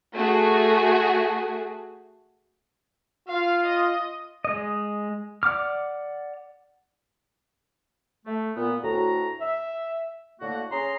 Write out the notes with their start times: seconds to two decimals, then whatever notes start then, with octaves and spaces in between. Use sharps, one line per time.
0.14 A3 F#4 G#4
3.28 F4 F5
3.66 D#5
4.45 G#3 D#5
5.43 D5 F#5 D6 F6
8.26 A3
8.56 A#2 B3
8.83 D2 A2 F#4 A#5
9.41 E5
10.40 A2 D3 A#3 F#4
10.72 C#4 G#4 A#5 C6